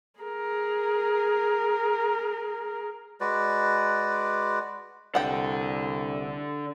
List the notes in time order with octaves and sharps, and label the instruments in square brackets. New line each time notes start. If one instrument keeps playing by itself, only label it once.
[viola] G#4 A#4
[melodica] G#3 F#4 B4 D5
[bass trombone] C2 [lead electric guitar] D3 A4 [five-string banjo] F#5 G5